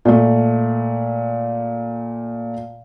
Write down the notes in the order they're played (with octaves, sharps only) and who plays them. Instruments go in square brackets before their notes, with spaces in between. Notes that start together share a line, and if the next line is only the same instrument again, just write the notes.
[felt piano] A#2 A3